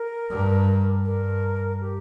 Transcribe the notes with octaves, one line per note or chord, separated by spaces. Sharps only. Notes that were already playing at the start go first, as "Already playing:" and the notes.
Already playing: A#4
G2
G2 A#4
G4